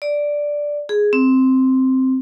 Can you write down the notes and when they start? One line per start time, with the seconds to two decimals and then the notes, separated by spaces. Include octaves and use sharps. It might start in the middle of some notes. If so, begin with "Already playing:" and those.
0.02 D5
0.89 G#4
1.13 C4